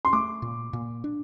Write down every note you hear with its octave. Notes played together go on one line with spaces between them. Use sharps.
C6
A3 D6
A#2
A#2
D4